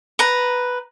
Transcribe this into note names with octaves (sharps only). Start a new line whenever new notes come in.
B4 A#5